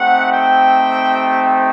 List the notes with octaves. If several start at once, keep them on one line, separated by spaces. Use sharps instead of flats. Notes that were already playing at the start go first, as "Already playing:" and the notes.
Already playing: A3 C4 D#4 G4 F#5
G5